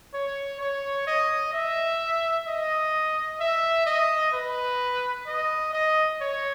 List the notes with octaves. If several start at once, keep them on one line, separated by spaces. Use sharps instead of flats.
C#5
C#5
D#5
E5
D#5
E5
D#5
B4
D#5
D#5
C#5